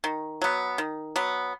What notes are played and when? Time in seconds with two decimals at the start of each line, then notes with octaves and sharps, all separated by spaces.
0.04 D#3
0.42 F#3 B3
0.78 D#3
1.16 F#3 B3